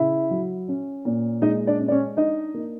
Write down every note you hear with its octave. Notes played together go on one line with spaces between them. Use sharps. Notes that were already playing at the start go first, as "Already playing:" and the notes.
Already playing: C#3 E4 E5
F#3
C#4
A#2
G#3 D#4 D#5
D4 D5
C#4
D5
C#4 C#5
D4 D#4 D#5
A#3